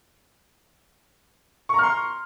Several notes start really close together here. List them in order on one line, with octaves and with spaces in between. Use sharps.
C#6 A#5 F6 C6